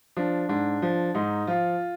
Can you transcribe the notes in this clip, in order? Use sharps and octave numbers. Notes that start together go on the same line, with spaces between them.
F3 D4
G#2 D4
F3
G#2 D#4
F3 F4